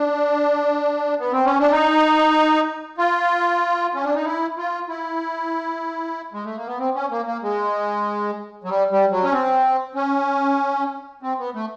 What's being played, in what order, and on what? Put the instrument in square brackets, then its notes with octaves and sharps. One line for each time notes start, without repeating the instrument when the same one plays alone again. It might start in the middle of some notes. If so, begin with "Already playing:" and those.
Already playing: [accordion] D4
B3
C4
C#4
D4
D#4
F4
C#4
D4
D#4
E4
F4
E4
G#3
A3
A#3
B3
C4
C#4
A#3
A#3
G#3
F#3
G3
G3
F#3
C#4
C4
C#4
C4
B3
A3